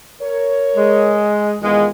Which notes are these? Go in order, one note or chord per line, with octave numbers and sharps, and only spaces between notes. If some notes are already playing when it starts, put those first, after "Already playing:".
A#4 C#5
G#3
E2 D#3 G#3 B3 F4